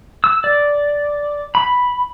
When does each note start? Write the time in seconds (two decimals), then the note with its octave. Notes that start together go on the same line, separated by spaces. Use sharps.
0.24 E6
0.44 D5
1.55 B5